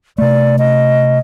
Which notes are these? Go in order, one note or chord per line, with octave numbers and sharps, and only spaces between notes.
C3 A3 D5
D#5